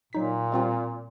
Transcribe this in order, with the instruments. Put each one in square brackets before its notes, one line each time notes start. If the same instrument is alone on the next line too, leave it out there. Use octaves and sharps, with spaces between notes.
[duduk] A#2 [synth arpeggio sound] F#3 D#4 B6
[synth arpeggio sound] G3 C4 F4